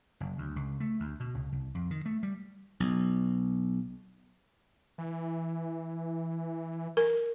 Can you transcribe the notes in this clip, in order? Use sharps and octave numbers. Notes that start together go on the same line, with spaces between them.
F#1
D2
C#2
A3
D2
B2
C#2
C2
F2
D#3
A3
G3
B1
E3
A#4